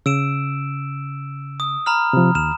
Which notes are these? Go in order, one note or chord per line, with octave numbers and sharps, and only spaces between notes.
C#3 E6 D7 E7
D#6
A#5 B5 F6
C3 F3
D#2 F6 E7